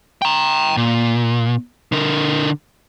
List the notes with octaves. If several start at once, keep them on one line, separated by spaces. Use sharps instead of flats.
G5 A#5
A#2
D3 A#4